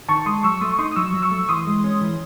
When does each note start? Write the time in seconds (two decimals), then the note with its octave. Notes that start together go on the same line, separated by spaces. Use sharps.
0.09 D#3 A5 C#6
0.20 C#6
0.26 G#3 C6 D#6
0.43 F#3 C#6 E6
0.61 A3 C6 D#6
0.71 C#6
0.78 D#4 C6 D#6
0.91 D#6
0.96 F#3 C#6 E6
1.14 F#3
1.22 C#6 E6
1.31 A3
1.49 E3 C6 D#6
1.67 G#3
1.84 C#4
2.01 E3